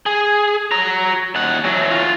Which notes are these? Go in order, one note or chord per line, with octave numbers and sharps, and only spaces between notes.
G#4
F#4 A#5
D#2 F#5
E3 F#3
F4 F#4